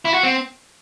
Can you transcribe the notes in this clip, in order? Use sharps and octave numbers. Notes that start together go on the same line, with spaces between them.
E4
F#4
C4